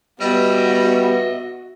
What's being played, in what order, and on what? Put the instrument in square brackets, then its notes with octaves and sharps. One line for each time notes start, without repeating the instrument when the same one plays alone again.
[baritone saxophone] G3 [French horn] B3 [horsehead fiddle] F#4 [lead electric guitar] D#5 E5